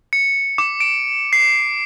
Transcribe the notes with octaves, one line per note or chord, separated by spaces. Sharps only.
C#7
D6
D7
C7